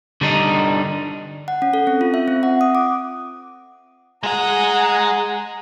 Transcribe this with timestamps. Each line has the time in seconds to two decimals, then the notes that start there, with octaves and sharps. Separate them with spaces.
0.21 D3 G3 D4 D#4
1.48 F#5
1.62 C#4
1.74 A4
1.87 C4
2.01 F4
2.14 E5
2.28 C4
2.43 F#5
2.61 D#6
2.75 D6
4.23 G#3 G#4 F#5 G#5 A#5